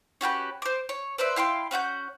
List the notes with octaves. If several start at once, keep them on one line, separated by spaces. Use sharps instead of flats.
C#4 F#4 G4 B4
C5 D6
C#5
B4 C5 D5 E5
E4 F5 G5 C6
C#4 F#4 F#5 G6